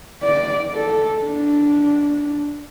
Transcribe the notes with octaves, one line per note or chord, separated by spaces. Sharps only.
D5
A4
D4